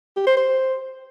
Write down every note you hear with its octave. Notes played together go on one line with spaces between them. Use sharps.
G4
C5
C5